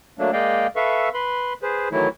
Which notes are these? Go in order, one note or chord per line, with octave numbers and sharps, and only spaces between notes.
F#3 A3 A#3 D4
G#3 A#3 D5 D#5 F5 G5
A4 B4 E5 F5 C#6
B4 B5 C6
G#4 B4 C5
D#3 E3 F#3 A3 E4